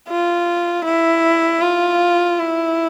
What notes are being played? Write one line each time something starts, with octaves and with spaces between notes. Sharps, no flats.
F4
E4
F4
E4